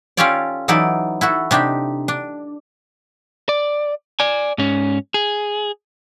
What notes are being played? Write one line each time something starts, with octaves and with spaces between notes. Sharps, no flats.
C#4 F4 G4 A4 C#5 D5
E3 F#3 D#4 E4 A4 D5
E4 F#4 A4
C3 D4 D#4 G4
D4
D5
D5 G#5
G#2 C#4
G#4